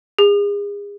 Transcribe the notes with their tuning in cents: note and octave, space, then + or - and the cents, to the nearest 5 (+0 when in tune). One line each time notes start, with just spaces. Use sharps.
G#4 -35